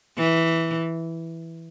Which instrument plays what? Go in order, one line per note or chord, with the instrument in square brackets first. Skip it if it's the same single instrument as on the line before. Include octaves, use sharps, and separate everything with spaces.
[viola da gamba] E3